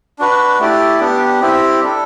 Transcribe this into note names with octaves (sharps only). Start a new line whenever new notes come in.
D4 F#4 B4
A3 E4 G4 D5
B3 D4 G4
C4 E4 G4
G3 D4 A4